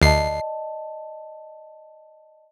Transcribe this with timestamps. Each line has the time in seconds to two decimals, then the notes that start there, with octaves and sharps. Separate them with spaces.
0.02 D2 D5 D#5 A5 C7